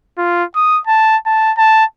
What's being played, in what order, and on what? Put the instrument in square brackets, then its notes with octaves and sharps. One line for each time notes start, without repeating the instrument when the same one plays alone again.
[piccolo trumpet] F4
D#6
A5
A5
A5